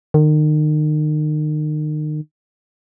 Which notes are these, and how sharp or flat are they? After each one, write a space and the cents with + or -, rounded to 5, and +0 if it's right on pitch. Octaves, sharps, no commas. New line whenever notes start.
D#3 -35